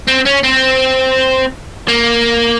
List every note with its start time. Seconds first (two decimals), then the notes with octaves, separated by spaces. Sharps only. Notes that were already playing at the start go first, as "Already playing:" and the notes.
0.08 C4
0.26 C#4
0.44 C4
1.88 A#3